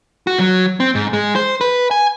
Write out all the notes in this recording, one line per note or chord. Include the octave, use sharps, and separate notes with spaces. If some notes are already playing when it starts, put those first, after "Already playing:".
F#4
F#3
C4
G#2
G#3
C5
B4
G#5